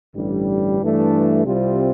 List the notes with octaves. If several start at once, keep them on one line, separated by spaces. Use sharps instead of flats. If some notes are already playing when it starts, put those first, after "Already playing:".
A1 G2 D3 G3
G2 E3 A3 D4
C2 C3 G3 C4 F4